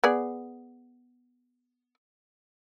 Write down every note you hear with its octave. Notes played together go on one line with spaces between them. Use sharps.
B3 G#4 D5